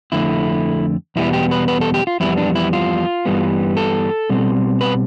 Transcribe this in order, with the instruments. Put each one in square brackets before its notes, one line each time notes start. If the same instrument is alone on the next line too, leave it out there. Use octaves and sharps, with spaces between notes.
[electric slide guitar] F2 D3 A3 E4
E2 B2 G3 B3 E4
G4
B4
B4
A4
G4
F4
F2 E3 G3 B3 E4
D4
E4
F4
G2 E3 G3 B3
A4
B2 G3 C4
B4